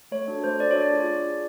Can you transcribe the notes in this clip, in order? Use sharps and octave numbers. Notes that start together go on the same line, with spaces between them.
A3 C#5
D4 F#4 A4
A3 C5
D4 F#4 A4 D5
C#5
D4
D5
F4 G#4
D4
F4 G#4